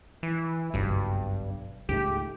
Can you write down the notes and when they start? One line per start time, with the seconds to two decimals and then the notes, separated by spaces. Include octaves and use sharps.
0.23 E3
0.74 F#1 B1 G2
1.89 C#2 G#2 A3 G4